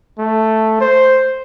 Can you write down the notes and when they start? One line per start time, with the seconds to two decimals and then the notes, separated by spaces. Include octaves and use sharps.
0.19 A3
0.80 C5